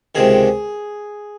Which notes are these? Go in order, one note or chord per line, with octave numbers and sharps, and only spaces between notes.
C#2 C3 D#3 G#4